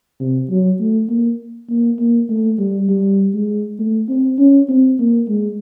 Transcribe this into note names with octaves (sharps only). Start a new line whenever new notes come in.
C3
F#3
A3
A#3
A#3
A#3
A3
G3
G3
G#3
A3
C4
C#4
C4
A#3
G#3